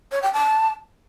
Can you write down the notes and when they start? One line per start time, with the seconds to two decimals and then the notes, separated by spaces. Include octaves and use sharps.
0.12 C#5
0.23 G5
0.33 A5